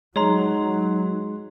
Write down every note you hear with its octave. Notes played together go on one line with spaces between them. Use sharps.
F#3 G#3 D#4 C#5 A#5 C6